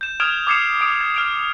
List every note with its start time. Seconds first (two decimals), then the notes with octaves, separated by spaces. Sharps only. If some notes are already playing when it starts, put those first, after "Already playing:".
0.01 G6 E7
0.20 D#6 F6 G#6 D7 E7 F7
0.47 D6 D#6 G#6 C7 C#7 E7
0.81 D#6 D7
1.01 G#6
1.15 F6 D7 F7